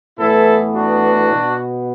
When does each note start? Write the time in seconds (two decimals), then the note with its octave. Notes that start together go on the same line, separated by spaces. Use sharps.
0.19 A2 E3 B3 E4 A4
0.74 D4 F#4
1.31 B2 B3